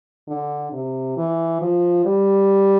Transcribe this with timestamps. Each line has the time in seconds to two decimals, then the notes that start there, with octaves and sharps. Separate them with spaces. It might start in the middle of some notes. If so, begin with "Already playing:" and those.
0.28 D3
0.73 C3
1.17 E3
1.62 F3
2.05 G3